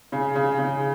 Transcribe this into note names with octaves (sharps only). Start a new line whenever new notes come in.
C#3
C#3
C#3